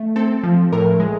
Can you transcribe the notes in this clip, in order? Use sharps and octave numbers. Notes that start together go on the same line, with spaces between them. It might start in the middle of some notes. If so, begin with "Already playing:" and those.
Already playing: A3
C4 A4
F3
A2 A#4
G#3